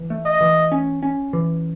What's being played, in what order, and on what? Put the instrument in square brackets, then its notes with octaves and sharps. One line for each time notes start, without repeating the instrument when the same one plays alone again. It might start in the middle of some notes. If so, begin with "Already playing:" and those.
Already playing: [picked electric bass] E3
A3
[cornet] D#5
[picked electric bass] E3
C#4
C#4
E3